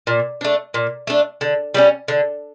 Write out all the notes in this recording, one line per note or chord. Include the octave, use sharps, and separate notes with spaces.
A#2
A3 D4
A#2
A3 D4
D3
G3 A#3 C#4
D3